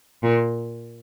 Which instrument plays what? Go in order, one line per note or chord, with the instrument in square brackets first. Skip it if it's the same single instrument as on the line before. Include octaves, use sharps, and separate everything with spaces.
[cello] A#2